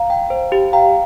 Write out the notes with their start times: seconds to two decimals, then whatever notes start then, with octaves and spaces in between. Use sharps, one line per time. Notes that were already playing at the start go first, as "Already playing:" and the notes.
Already playing: F5 A#5
0.10 G5
0.30 C5
0.52 G4
0.73 F5 G5 A#5